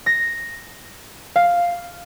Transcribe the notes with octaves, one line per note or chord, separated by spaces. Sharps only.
A#6
F5